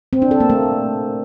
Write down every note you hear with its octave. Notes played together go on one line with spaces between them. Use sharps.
C4
D4
A4
A#3
A3